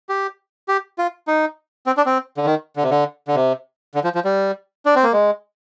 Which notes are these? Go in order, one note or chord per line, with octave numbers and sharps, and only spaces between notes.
G4
G4
F4
D#4
C4
D4
C4
D3
D#3
D3
C3
D3
D3
C3
D3
F3
F3
G3
D4
C4
A#3
G#3